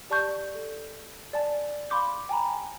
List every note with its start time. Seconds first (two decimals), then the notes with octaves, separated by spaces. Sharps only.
0.10 G4 D5 A5 C#6 G6
0.55 A4
1.33 D5 G#5 A5
1.90 F5 B5 C6 D6 G6
2.29 G5 G#5 A#5 B5